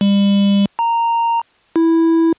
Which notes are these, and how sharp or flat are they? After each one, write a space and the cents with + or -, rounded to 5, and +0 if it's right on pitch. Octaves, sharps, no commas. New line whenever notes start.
G3 +35
A#5 -10
E4 -5